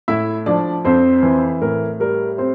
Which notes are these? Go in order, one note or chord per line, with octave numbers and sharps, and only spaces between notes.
A2 E4 E5
F3 D4 D5
F2 C4 C5
E3
A2 A#4
G3 A#4
C4 C5